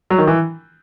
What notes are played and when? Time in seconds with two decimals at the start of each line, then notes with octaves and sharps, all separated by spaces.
0.10 F#3
0.18 D#3
0.27 E3